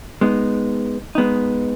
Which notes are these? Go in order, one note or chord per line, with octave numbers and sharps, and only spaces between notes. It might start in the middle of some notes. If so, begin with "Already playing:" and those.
G#3 B3 D#4
G#3 B3 D#4